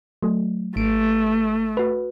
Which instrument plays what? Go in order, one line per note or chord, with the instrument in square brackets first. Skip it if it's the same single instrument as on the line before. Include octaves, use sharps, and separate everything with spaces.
[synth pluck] F#3 A3
[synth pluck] G#1 D7 [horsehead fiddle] A3
[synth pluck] F#4 B4